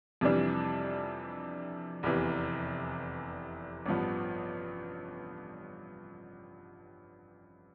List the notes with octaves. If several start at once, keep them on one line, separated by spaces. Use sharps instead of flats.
F2 C3 E3 G3 D4
F1 E2 C3 E3
A1 G2 F3 B3